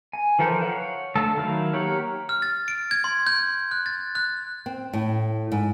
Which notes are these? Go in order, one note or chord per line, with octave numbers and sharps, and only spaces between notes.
G#5
E3 F3 A4 A#4 G5
C#5 F5 F#5
D3 A3 A5 E6
D#3 F#3 E4 F5 F6
A#3 G4 A#4 C#5 F#5
F6
A6
D7
G#6
C6
G6
F#6
A6
F#6
C4
A2
G#2